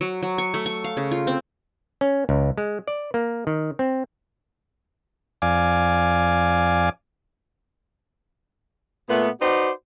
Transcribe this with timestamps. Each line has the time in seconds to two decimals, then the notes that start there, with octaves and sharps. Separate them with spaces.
0.01 F#3
0.23 F#3
0.38 C#6
0.54 A3
0.66 C#6
0.84 F5
0.97 C#3
1.11 F4
1.27 C4
2.01 C#4
2.29 C#2
2.57 G#3
2.88 D5
3.14 A#3
3.47 D#3
3.79 C4
5.42 F2 D5 F5 G#5 D6
9.09 A#2 A3 B3
9.41 D#4 F#4 B4 C5 D5